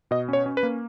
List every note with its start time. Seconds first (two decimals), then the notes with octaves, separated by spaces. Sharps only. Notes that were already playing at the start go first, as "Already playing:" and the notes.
0.11 B2 D#5
0.29 C#4 C#5
0.46 C#4
0.57 B4
0.63 A#3